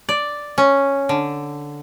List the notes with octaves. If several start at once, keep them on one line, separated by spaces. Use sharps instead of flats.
D5
C#4
D3